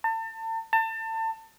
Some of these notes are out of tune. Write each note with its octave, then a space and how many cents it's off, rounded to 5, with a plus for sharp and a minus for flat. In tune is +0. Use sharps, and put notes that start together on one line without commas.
A5 +35
A5 +30